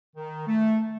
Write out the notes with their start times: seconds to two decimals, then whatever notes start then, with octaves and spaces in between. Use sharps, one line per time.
0.16 D#3
0.47 A3